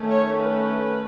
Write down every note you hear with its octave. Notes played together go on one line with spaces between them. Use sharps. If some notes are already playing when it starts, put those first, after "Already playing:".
Already playing: D#3 A3 C#4
C#5
B4